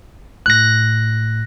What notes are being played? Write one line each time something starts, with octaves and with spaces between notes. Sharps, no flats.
A2 F#6 A#6